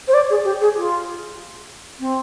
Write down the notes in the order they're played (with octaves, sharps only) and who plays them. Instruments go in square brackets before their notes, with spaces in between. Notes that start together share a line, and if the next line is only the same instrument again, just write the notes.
[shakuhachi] C5
D5
G#4
G4
G#4
F4
C4